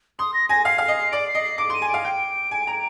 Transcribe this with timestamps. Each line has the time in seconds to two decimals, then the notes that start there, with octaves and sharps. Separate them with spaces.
0.19 C6 D#6
0.34 A#6
0.49 G#5 A#6
0.65 F5 C7
0.78 F5 C7
0.88 D#5
0.97 C7
1.11 D5 D7
1.27 C7
1.35 D#5
1.44 C7
1.58 D6 D7
1.70 C6
1.74 D#7
1.82 G#5
1.89 F5 D7
2.05 G5
2.51 G#5
2.67 A#5